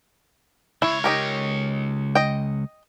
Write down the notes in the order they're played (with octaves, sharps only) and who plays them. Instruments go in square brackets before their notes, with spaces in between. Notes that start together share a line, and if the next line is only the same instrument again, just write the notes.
[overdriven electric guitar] C#2 C#5 [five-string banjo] E4
[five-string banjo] D#4 G4 A#4
D#5 G5